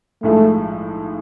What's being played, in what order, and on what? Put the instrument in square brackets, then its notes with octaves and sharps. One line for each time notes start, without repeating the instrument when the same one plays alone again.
[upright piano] B1 A2 F3 G#3 [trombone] A3